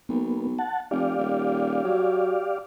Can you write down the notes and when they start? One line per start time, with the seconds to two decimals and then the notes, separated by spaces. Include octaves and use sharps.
0.09 B1 A#3 B3
0.59 F#5 A5
0.91 F1 G4 D5 F5
1.18 D#1
1.84 F#3